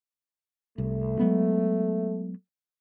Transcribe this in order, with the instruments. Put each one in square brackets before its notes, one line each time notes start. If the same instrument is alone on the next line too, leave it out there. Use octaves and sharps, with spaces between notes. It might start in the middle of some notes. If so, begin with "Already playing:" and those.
[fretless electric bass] C2 [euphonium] A3
[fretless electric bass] F#3 G#3 B3